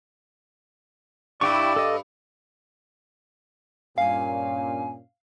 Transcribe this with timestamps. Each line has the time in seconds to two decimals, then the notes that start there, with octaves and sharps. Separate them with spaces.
1.41 G2 E4 D5 G5 C#6
1.76 A4 D#5
3.98 G2 A#2 C#4 F5 G#5